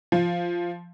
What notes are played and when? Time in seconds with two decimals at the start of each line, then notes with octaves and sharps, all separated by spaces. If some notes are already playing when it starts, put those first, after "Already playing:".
0.12 F3